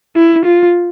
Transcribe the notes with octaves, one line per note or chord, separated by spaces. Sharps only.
E4
F4